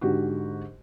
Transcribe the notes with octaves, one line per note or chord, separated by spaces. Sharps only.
G#2 D3 F#4 G4